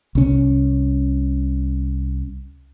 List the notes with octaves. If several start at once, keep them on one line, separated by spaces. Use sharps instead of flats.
C2 C#4